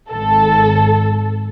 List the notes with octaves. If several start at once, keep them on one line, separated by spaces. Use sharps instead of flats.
G#1 A4